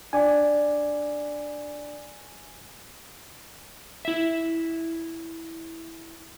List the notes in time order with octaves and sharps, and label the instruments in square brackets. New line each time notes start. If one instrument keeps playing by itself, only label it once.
[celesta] D4 D5 [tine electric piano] G#5 D6
[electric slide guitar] E4 E5